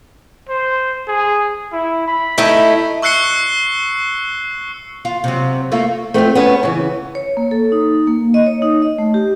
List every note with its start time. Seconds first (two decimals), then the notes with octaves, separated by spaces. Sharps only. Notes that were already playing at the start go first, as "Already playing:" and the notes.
0.49 C5
1.08 G#4
1.73 E4
2.08 B5
2.38 A3 D#4 E4
3.02 C#6 E6 F#6 C7 C#7 G7
5.05 F4
5.24 C3 F#3
5.72 A3 A#3 F4
6.14 A3 B3 C4 F4
6.35 B3 C#4 C#5
6.63 C#3 E3
7.15 C#5
7.37 A#3
7.51 A4
7.72 D#4
8.07 A#3
8.34 D#5
8.46 C#5
8.62 D#4
8.82 D#5
8.98 A3
9.14 G4